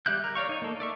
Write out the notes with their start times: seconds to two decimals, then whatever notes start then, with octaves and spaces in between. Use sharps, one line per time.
0.06 G3 G4 E5 F#6 G6
0.24 A#4
0.35 C#5 D5 F5 C#6
0.49 D#4
0.62 A#3 A4
0.80 D5 E5 C#6